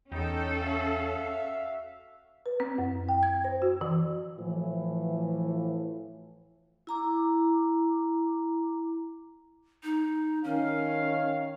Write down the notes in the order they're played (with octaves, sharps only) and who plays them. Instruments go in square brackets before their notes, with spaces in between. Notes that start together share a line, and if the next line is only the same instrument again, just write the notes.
[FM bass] E2 [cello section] C#4 A4 [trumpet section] D#4 G5
[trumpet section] F#4 E5 F5
[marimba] B4
C4
F#2
G5
G#6
C5
F#4
E3
[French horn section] A2 E3 F3
[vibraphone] E4 A#5 D6
[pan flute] D#4
[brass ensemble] D#3 C#5 F5 [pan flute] C#4